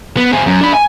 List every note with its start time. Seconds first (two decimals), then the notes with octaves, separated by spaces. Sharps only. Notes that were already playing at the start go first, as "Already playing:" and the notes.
0.17 B3
0.32 C4 G#4
0.46 F#2
0.61 D4 B5
0.74 G#5